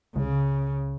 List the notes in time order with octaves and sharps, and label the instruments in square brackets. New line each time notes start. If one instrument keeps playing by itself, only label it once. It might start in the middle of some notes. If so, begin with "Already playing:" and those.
[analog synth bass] C#2 [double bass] C#3